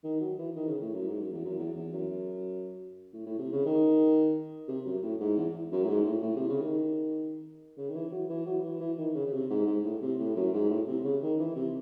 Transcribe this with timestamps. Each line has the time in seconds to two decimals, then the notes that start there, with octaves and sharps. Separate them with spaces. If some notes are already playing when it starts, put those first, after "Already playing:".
0.04 D#3
0.21 F#3
0.38 E3
0.56 D#3
0.68 C#3
0.82 A2
0.94 F#2
1.08 G#2
1.20 F#2
1.32 E2
1.45 F#2
1.59 E2
1.76 E2
1.93 F#2
3.13 A2
3.26 A2
3.39 C3
3.52 C#3
3.65 D#3
4.68 C3
4.85 F#2
5.03 A2
5.20 G#2
5.37 E2
5.72 F#2
5.84 A2
5.88 G#2
6.06 A2
6.23 A2
6.36 C3
6.49 C#3
6.62 D#3
7.77 C#3
7.90 D#3
7.95 E3
8.12 F#3
8.30 E3
8.46 F#3
8.64 E3
8.81 E3
8.98 D#3
9.15 C#3
9.26 C#3
9.33 C3
9.50 G#2
9.67 G#2
9.85 A2
10.02 C3
10.19 A2
10.36 F#2
10.54 G#2
10.70 A2
10.87 C3
11.04 C#3
11.22 D#3
11.39 E3
11.56 C3